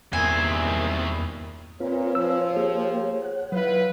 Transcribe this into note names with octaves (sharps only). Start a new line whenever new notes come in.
E2 G2 A#2 D#3 C4 E4 G#5
A#2 C4 F4 B4 C#5
F3 E6
A#3 G4 G#4
F#5
F#3 E4 F4 B4